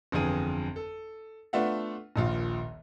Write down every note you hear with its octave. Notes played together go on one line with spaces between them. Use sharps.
G1 F2 D3 E3 G#4 D#7
A4
A3 B3 D4 F4 E5 F#5
D#1 A#1 F4